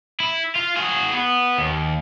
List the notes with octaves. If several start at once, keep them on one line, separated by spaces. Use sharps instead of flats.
E4
F4
F#4 G#4
B3
D#2